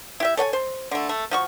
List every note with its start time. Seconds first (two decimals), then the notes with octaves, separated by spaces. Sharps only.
0.20 E4 G4 E5
0.37 A4 C#5 F#5 G#5
0.53 C5
0.91 D3 A3
1.09 A3
1.31 F3 F#4 C#6